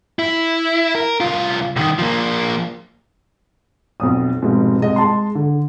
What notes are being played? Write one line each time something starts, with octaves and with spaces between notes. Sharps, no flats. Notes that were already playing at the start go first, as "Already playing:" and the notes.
E4
A#4
C2 F4
C2 D#3
F3 A#3
B1 F2 D#6
F1 G#2 B2
C2 G#3 D#5
G#3 A5 C6
D3